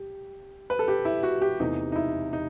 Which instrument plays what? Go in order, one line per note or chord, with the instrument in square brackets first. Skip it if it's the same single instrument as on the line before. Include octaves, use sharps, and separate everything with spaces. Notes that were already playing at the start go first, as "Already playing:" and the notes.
Already playing: [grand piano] G4
B4
A4
G4
E4
F#4
G4
E2 C3 E3 A3 D#4
D#4
E4
D#4